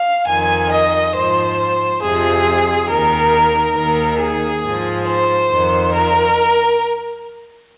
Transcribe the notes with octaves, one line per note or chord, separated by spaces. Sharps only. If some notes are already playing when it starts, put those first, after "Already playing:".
Already playing: F5
F2 D#3 G#5
D#5
G#2 F3 C5
F2 C3 F3 G#4
D#2 D#3 A#4
D#2 D#3 A#4
G#4
G#2 F3
C5
F2 D#3
A#4